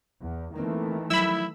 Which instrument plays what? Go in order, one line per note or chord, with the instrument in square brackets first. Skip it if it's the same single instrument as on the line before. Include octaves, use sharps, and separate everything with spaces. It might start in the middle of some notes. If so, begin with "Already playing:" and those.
[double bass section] E2
[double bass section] D#3 E3 A3 [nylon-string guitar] A#3 C4
[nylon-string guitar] F3 F#3 [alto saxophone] E4 [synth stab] B5 E6